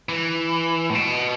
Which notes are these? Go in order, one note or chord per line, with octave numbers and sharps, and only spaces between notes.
E3
A2
B2